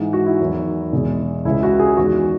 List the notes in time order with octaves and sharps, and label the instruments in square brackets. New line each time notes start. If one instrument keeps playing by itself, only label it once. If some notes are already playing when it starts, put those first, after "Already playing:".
Already playing: [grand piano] G#2 E3 G#3
F#4
E4
E2 D#3 F#3
E2 B2 G#3
C#2 C#3 G#3 E4
F#4
G#4
E2 D#3 G#3 F#4